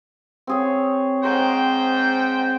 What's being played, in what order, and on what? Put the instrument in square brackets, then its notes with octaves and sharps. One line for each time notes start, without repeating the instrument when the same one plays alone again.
[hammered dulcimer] C4 G#4 C#5
[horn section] G#2 C5 G5 [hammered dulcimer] F#5 A#5 C6